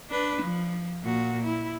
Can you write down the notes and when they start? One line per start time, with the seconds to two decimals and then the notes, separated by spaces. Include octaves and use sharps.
0.10 D4 B4
0.42 F3
1.02 A#2 F#4
1.43 E4